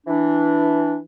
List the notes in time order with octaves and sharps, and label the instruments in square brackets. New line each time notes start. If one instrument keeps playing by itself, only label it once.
[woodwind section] E3 D4